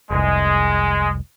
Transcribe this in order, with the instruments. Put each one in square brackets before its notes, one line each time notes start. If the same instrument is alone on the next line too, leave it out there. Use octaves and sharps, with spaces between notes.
[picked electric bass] F1 C2 [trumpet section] G#3